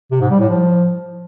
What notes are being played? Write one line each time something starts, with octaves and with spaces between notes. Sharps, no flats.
C3
G#2
G3
A2
F3